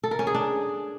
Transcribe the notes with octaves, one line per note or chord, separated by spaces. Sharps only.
A4
A#4
C#4
G#4
D4